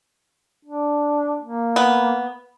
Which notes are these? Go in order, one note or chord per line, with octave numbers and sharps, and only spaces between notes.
D4
A#3
B3